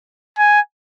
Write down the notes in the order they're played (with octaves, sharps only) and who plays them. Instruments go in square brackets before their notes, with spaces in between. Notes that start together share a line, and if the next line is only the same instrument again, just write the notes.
[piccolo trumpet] G#5